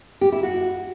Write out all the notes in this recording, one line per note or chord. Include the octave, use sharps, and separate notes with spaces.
G4
E4
F#4